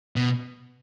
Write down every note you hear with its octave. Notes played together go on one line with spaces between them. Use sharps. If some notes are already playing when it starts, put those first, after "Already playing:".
B2